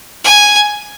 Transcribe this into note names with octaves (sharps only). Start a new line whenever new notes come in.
G#5